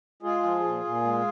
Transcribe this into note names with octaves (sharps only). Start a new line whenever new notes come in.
G#3 F4 G#4
F3
A#2
A#2
G#3